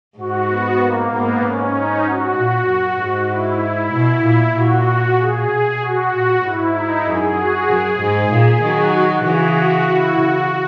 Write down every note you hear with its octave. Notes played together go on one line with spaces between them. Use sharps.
G#2 F#4
B3
A#3
G#2 B3
G#2 C#4
D#4
F#4
A#2 F#4
F#2
G#2
E4
B2 E4
A#2 E4
A#2 F#4
F#4
G#4
B2
F#4
A#2 F#4
G#2 E4
D#4
F#2 G#4
F#4
F#2 G#4
G#2
A#2 G#4
D#3 F#3 F#4
F#4
C#3 E3 G#4
F#4
E4
C#3 F#4